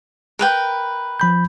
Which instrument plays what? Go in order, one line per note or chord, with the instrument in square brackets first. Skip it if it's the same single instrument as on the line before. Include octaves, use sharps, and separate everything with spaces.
[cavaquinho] A#4 B4 G5
[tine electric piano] F3 B5 G6